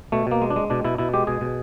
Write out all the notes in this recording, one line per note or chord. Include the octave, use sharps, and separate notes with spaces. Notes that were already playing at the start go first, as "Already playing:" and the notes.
B2 A3
B2 A#3
G#3
D4
G#3
B2 D4
B2 E4
B2 E4
G#3 G4
B2 G#4
B2